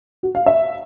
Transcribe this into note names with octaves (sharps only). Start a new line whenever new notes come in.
F#4
F5
E5